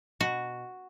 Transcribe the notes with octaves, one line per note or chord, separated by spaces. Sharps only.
B2 F#4